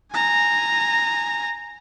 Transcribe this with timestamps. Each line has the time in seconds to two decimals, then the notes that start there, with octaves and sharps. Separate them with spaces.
0.12 G#5 A#5